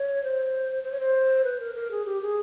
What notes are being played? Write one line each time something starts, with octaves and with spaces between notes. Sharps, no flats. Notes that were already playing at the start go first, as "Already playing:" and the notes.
Already playing: C#5
C5
C5
C#5
C5
B4
A#4
A#4
G#4
G4
G#4